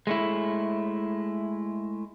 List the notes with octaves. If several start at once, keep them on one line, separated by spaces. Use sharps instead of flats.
G#3 A3 E4